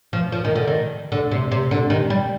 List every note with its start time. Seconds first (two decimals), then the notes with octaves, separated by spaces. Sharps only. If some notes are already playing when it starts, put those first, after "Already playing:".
0.13 F3
0.32 F3
0.45 D#3
0.55 D3
0.68 D#3
1.12 D3
1.31 C3
1.51 C3
1.71 D3
1.90 D#3
2.10 G3